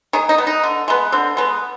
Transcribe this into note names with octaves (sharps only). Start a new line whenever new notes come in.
D#3 G#4
D#4
B3
D#4
D3
G#3 B3
D3 C4
G#3 B3